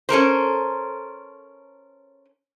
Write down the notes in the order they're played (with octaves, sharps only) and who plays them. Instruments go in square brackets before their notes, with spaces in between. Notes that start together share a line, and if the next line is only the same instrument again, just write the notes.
[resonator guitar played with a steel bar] C#4 A4 A#4 C5